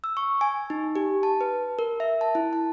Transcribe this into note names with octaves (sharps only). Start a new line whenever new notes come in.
E6
C#6
G#5
D#4
G4
A5
B4
A#4
E5
A5
E4
A5